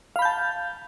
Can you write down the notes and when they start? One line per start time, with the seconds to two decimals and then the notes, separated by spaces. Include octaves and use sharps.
0.16 F5
0.19 B5
0.22 G6
0.25 A5